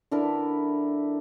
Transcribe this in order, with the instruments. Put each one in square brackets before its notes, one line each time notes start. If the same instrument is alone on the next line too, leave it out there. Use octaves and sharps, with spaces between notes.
[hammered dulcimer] D3 D4 E4 A#4